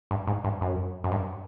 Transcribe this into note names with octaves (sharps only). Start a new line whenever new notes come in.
G2
G#2
G2
F#2
F#2
G2